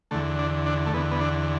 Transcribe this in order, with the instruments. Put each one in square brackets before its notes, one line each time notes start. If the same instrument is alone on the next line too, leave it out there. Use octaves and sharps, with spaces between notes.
[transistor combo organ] E2 D3 A3
D4
D4
A3
E2 D3 B3
B3
D4